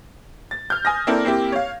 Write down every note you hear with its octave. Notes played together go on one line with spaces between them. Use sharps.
A6
F6 G6
G#5 D#6 A#6
A#3 C4 D4 E4 A4 A#4
A#3 C4 E4 G4
C#5 F5